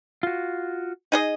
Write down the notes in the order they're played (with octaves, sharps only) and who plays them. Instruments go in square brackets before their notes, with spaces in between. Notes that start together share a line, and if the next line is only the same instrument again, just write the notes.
[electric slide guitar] F4 F#4
[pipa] D#4 G#4 D#5